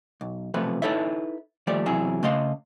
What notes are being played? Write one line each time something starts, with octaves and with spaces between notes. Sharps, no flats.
B1
B1 C3 F3 A3 B4
D#4 E4 A4 B4 C#5 E5
D#2 F3 G3 A3 D5
E2 C3 F#3 E4 G#4
C#3 A3 D#5 F5 C6